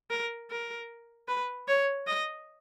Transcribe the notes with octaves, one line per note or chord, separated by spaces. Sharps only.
A#4
A#4
B4
C#5
D#5